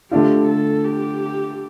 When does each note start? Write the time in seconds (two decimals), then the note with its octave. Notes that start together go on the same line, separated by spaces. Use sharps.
0.11 D3 A3 D4 F4 G4
0.48 A4
0.84 G4